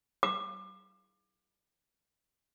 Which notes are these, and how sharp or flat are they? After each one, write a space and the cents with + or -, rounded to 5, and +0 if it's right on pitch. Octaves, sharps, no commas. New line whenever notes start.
D6 +30